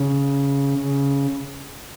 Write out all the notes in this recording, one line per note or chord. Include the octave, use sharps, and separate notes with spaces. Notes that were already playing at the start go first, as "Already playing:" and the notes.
Already playing: C#3
C#3